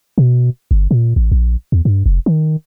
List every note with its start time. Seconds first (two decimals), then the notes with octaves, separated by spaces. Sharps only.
0.18 B2
0.71 G1
0.91 A#2
1.16 A1
1.32 A#1
1.72 E2
1.85 G2
2.06 F1
2.26 D#3